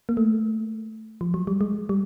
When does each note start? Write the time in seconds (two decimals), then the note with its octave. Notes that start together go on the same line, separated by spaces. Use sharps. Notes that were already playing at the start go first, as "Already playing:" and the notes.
0.09 A#3
0.17 A3
1.21 F3
1.34 F#3
1.47 G3
1.61 G#3
1.89 G3